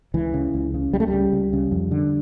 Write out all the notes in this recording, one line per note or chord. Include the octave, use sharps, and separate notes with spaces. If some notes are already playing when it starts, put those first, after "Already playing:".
C#2 E3
C#3
C#2
C#3
C#2 G3
A3
G3
C#3
C#2
C#3
F2
D3